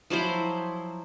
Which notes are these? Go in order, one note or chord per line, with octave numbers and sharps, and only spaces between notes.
F3 F#3 E4 C5